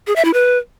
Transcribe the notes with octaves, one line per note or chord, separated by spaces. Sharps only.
G#4
E5
E4
B4